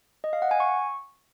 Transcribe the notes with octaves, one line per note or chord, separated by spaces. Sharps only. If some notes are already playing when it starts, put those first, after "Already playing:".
D#5
F5
F#5
G#5
C#6